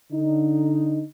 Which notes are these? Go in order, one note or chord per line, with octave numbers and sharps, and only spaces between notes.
D3 D#4